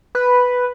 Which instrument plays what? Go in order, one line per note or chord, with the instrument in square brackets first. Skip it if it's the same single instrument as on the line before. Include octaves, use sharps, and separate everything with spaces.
[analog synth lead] B4